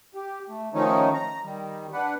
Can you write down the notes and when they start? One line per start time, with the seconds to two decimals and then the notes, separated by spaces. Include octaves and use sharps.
0.14 G4
0.49 A3
0.74 D#3 F3 A3 C#4 D#4
1.14 A#5
1.44 D#3 G3
1.93 D4 B4 F#5